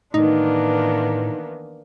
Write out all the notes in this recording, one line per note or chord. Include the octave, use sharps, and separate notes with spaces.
A2 D#3 E3 A#3 B3 D4 D#4